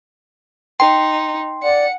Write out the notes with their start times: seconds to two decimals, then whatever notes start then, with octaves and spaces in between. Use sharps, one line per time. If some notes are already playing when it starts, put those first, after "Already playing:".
0.80 D#4 G5 C6
1.63 D5 F#5 C#7